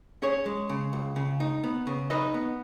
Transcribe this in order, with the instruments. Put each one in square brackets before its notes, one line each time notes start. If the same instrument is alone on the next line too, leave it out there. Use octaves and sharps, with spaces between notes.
[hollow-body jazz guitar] C#4 G#4 C#5
G#3
C#3
C#2
C#3
D#4
B3
C#3
D#4 B4 D#5
B3